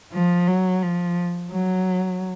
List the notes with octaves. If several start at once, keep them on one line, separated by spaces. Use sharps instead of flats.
F3
F#3
F3
F#3